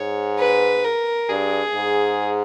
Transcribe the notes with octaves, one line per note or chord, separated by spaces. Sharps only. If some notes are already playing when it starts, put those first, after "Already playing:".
Already playing: G#2 C#5
B4
A#4
G2 G#4
G#2